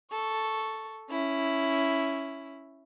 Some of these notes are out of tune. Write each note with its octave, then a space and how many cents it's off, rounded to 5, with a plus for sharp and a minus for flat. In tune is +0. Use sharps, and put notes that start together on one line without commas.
A4 +0 C#6 +0
C#4 +0 E4 +0